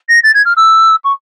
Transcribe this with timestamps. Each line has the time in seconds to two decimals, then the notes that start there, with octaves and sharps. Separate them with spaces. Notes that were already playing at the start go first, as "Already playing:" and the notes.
0.09 A#6
0.23 A6
0.34 G#6
0.45 F6
0.57 E6
1.04 C#6